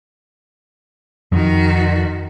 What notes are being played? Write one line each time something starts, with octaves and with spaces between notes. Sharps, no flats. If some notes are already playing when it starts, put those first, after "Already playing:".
F2 D#3 F#4